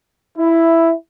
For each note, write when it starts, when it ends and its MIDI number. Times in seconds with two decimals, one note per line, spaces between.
0.38 0.91 64